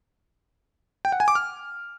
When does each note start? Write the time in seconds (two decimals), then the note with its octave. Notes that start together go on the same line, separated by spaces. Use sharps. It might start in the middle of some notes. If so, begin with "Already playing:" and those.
1.05 G5
1.12 F#5
1.20 G#5
1.28 D6
1.35 F6